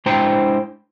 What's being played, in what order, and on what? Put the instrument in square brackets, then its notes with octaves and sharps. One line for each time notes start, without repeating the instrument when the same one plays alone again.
[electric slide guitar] G#3 D4 E4 C5 G5 A#5